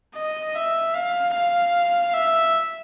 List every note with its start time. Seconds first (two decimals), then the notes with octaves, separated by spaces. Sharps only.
0.15 D#5
0.55 E5
0.95 F5
1.34 F5
2.14 E5